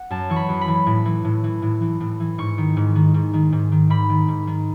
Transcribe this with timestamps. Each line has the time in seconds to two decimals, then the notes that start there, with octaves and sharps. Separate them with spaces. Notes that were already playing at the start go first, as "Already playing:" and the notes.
Already playing: F#5
0.10 F#2 A5
0.30 E3 C#6
0.36 B5
0.49 F#2
0.61 B5
0.68 E3
0.87 A2
1.05 E3
1.24 A2
1.44 E3
1.62 A2
1.82 E3
2.00 A2
2.20 E3
2.38 G#2 C#6
2.58 D#3
2.77 G#2
2.95 D#3
3.14 G#2
3.34 D#3
3.52 G#2
3.72 D#3
3.90 G#2 B5
4.09 D#3
4.28 G#2
4.47 D#3